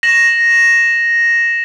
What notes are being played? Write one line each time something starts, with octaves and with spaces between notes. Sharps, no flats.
A#6 E7 F#7